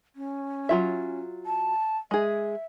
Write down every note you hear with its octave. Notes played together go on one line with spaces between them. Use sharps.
C#4
F#3 F4 E5
A5
G#3 G#4 E5